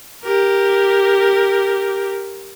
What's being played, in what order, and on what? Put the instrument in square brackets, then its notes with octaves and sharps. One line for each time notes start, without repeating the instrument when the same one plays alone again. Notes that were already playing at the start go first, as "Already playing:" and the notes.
[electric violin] G4 A#4